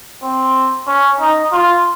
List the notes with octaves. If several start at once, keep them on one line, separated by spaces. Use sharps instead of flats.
C4
C#4
D#4
F4